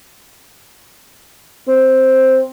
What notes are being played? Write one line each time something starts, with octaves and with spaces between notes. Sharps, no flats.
C4